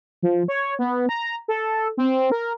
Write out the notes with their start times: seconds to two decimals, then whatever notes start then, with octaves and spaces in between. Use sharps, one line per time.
0.22 F3
0.48 C#5
0.79 B3
1.09 A#5
1.48 A4
1.97 C4
2.32 A#4